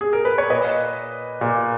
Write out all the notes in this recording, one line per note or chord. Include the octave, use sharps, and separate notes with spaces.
G#4
A#4
B4
C#5
A#2 B4 D#5
A#2